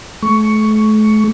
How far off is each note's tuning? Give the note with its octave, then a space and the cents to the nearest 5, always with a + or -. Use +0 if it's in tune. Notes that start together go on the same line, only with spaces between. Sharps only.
A3 -40 C#6 +10